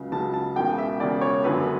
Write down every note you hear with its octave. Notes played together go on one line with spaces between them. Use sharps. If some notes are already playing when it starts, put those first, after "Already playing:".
Already playing: C#2 C#3 F#3
C#2 C#3 F#3 A5
A5
E1 E2 C#3 G5
E5
E1 E2 C#3 D5
C#5
G1 F#2 D3 F#3 B3 B4